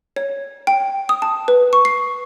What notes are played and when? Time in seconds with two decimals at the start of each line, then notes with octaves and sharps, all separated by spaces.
0.16 C#5
0.67 G5
1.09 D#6
1.22 A5
1.48 B4
1.73 C#6
1.85 C7